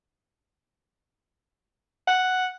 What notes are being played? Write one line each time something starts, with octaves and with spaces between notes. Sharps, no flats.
F#5